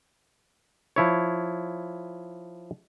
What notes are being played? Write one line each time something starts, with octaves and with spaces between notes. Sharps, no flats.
F3 E4 C#5